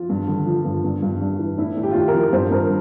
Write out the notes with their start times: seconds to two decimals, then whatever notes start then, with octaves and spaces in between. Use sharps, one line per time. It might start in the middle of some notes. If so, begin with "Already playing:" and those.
Already playing: F3 F4
0.09 G2
0.28 D3
0.47 F3
0.65 G2
0.84 G2
1.02 G2
1.21 G2
1.39 E3
1.58 A2 E4
1.77 A2
1.83 G4
1.91 F4
1.95 A2 G4
2.08 A#4
2.14 F3
2.33 G2 C5
2.51 G2 A#4